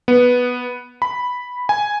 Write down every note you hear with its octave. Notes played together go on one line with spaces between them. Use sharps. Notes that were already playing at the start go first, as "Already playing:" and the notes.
B3
B5
G#5